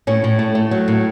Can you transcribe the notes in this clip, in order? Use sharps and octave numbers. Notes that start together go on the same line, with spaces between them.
A2 C#4
A2
A3
A3
F#3
A2